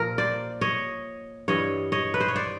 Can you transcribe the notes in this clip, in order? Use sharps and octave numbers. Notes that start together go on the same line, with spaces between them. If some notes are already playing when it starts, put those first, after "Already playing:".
Already playing: A#2 F3 A#4
C5 D5
C#5 D#5
G2 E3 G3 C#5 D#5
C#5 D#5
B4
C5
C#5
C5 D5